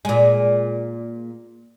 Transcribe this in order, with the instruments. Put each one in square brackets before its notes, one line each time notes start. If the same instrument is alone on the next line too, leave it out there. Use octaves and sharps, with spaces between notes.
[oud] A#2 G#3